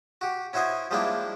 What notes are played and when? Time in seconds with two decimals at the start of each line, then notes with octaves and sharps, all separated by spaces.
0.21 F#4 G4
0.53 C#4 E4 F#4 C5 D#5 G#5
0.91 F3 G3 G#3 A#3 D4 E4